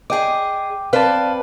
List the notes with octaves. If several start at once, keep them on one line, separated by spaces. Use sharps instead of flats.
G#4 D#5 G5 D6
C4 B4 D5 F5 A5